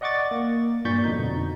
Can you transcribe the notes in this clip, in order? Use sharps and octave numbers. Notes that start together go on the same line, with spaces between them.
D5 D#5 F#5 C#6 D6 A6
A#3
G2 A#2 C#6 G6 A6 B6
F2 B2 D3 D#4 G6